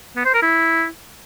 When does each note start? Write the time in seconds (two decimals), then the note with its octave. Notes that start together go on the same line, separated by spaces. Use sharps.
0.17 B3
0.25 C5
0.34 A#4
0.42 E4